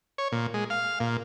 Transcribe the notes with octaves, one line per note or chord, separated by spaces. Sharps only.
C#5
A#2
G#3
F5
A#2